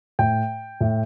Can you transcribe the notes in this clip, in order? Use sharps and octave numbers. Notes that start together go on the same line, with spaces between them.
A2 G5
A2